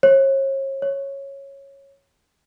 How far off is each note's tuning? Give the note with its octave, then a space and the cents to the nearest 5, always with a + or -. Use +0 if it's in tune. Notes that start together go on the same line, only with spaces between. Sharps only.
C#5 -40
C#5 -10